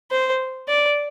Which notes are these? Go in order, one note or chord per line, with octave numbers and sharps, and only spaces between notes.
C5
D5